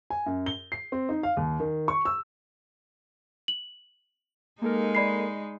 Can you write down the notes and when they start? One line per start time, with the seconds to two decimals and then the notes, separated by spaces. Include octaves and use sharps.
0.10 G#5
0.26 F#2
0.46 G7
0.72 C7
0.92 C4
1.09 D#4
1.23 F5
1.37 D#2
1.60 D#3
1.88 C#6
2.05 E6
3.48 F#7
4.62 G#3 A#3 D#4 A4 A#4
4.95 D5 B5 C7